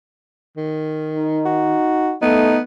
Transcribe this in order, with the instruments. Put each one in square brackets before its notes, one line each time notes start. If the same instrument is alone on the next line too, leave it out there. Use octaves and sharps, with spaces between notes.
[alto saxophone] D#3
[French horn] D#4
[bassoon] F#4
[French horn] A3 [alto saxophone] B3 [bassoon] D#4